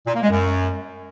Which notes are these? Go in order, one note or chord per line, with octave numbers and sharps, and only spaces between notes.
A#2
A#3
G#3
F#2